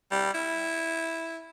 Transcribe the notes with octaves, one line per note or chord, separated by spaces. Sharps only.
G3
E4